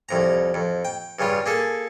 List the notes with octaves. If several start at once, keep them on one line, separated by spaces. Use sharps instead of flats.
C2 F2 A#5
F2
G5
G2 C#3 G3 F4
A#3 G#4 A4